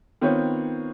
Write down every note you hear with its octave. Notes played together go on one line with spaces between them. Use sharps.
D#3 B3 C4 F4 C#5